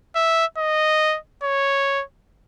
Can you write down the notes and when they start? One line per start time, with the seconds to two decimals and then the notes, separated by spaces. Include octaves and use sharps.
0.16 E5
0.58 D#5
1.43 C#5